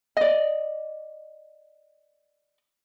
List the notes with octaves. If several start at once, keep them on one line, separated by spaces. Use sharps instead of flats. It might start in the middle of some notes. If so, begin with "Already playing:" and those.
D5 D#5